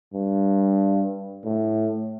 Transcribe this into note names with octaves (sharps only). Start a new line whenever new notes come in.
G2
A2